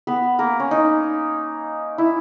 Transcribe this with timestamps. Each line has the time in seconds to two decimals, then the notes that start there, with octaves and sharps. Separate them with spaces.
0.07 B3 B4
0.39 A#3 A#4
0.60 C#4
0.71 D#4
1.98 E4